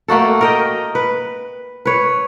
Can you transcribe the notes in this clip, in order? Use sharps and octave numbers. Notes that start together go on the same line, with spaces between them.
A3 A#3 F#4 A4
A#4 D#5 G5
B4
B4 C#5